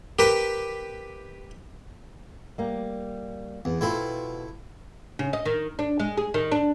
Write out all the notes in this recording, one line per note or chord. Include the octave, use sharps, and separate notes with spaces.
G4 A#4 B4
G3 A#3
E2 B3
B2 C4 E4 F4 A4 B5
C#3
D#5
D#3
D4
G#3
G#4
D#3
D4